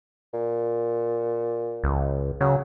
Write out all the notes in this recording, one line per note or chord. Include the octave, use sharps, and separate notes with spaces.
A#2
C#2
C#3 F#3